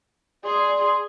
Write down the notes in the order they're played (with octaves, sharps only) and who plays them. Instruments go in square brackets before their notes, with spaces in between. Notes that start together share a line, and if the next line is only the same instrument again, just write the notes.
[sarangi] G#4 [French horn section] D5 [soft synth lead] C6